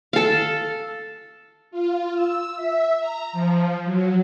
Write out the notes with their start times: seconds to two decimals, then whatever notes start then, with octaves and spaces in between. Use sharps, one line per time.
0.13 A4 F5
1.71 F4
2.15 E6
2.57 E5
3.00 A#5
3.33 F3
3.85 F#3